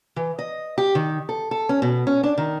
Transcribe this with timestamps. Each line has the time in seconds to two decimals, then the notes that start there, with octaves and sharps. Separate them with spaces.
0.16 E3
0.39 D#5
0.78 G4
0.95 D#3
1.29 A4
1.51 A4
1.69 C#4
1.82 B2
2.07 C#4
2.23 D4
2.38 D#3